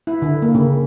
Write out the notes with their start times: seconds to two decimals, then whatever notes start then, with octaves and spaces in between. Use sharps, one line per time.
0.07 E4
0.22 D3
0.42 A#3
0.55 C#3